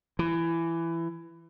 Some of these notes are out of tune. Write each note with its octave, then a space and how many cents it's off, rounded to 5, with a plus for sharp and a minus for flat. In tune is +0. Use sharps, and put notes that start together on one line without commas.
E3 +15